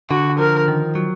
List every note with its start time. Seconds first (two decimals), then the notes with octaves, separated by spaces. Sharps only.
0.10 D3 F#4
0.39 F3 A#4
0.68 D#3
0.95 F#3